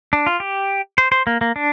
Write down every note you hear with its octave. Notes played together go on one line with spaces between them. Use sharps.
D4
F4
G4
C5
C5
A#3
A#3
D4